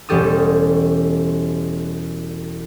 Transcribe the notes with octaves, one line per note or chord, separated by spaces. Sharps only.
E1 G3 C#4 G4 A4 D#6